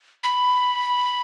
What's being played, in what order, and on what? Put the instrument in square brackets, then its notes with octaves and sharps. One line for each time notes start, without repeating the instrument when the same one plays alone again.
[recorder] B5